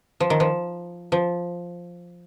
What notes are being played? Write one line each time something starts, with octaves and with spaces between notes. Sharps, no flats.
F3
D#3
F3
F3